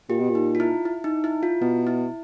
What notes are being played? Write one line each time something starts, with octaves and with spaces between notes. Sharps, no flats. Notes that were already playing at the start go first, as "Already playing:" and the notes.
A#2 G4
B2
A#2
D#4
F4
E4
E4
D#4
E4
F4
B2 E4
E4